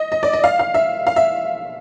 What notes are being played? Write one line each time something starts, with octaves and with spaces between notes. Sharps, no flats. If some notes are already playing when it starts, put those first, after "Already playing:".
Already playing: D#5
D#5
D5
D#5
F5
F5
E5
F5
E5